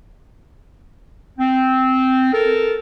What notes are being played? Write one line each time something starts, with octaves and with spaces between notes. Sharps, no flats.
C4
A4 A#4